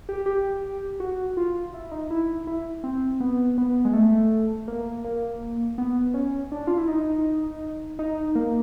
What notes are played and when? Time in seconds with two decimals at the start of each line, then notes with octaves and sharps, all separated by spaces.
0.09 G4
0.26 G4
1.00 F#4
1.37 F4
1.74 E4
1.91 D#4
2.11 E4
2.47 E4
2.84 C4
3.20 B3
3.58 B3
3.85 G#3
3.93 A3
4.68 A#3
5.04 A#3
5.78 B3
6.14 C#4
6.52 D4
6.67 F4
6.78 E4
6.88 D#4
7.99 D#4
8.35 A#3